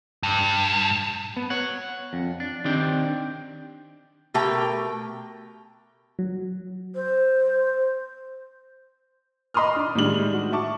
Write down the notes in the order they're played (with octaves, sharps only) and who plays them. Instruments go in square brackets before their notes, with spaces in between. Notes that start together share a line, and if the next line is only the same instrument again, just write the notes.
[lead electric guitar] G2
[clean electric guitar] B3
C#5 F#5
F2
D4
D#3 C4 D4 G4 G5
[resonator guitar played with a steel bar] B2 A3 G4 A#4 G5
[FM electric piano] F#3
[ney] C5
[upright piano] D#5 B5 C6 D6 D#6 F6
D4
A2 D#3 G3 G#3 D4 F#7
F#4
E5 A5 C#6 D6